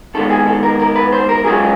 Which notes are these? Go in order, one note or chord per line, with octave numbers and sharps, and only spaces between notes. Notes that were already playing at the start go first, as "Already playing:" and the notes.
D#2 D#3 G#3 B3 A4
G#4
A4
A#4
A#4
B4
C5
A#4
F#2 C#3 F3 G#3 C#4 G#4